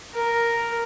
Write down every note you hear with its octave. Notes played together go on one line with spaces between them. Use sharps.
A#4